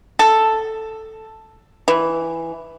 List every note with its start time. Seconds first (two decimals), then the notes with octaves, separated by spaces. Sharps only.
0.19 A4
1.88 E3